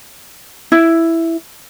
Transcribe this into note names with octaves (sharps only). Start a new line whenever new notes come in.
E4